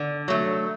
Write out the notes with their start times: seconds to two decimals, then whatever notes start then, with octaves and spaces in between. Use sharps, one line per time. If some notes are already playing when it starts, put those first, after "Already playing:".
Already playing: D3
0.28 F#3 A3